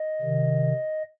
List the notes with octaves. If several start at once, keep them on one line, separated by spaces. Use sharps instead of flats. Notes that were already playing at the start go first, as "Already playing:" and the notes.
Already playing: D#5
C3 D#3